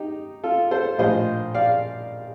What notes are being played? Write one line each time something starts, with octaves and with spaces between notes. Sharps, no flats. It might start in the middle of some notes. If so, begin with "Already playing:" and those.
Already playing: D#4 G4
F4 A4
A4 C5
A#1 A2 F3 C5 D#5
D5 F5